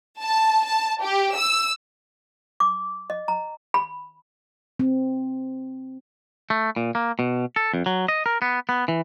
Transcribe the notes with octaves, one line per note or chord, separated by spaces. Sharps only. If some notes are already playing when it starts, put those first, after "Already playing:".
A5
A5
G4
E6
D6
D#5
A#5
B5
C4
A3
A#2
A#3
B2
A4
F2
F#3
D#5
A#4
B3
B3
E3